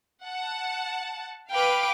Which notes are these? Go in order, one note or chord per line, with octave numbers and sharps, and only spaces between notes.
F#5 A5
B4 F5 G5 D6